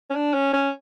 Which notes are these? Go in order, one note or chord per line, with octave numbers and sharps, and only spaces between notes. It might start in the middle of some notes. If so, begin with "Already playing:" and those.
C#4
D4
C#4
C#4